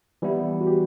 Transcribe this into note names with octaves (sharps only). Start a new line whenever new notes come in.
E3 G3 B3 E4
F#4
G4